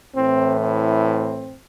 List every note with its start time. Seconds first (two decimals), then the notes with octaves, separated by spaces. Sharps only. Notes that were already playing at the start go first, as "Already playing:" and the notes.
0.15 A2 E3 C4
0.60 C4